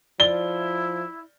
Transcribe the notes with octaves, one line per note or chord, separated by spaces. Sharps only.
F3 E4 D5 G7